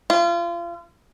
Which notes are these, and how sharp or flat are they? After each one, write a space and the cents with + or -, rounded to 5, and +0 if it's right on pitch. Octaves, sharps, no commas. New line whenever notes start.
F4 -30